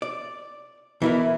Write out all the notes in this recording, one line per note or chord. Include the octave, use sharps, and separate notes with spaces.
D5
B2 E3 E4 A#4